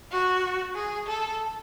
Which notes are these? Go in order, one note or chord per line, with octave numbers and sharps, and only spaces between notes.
F#4
G#4
A4